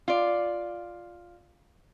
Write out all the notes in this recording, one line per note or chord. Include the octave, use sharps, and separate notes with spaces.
F4 D5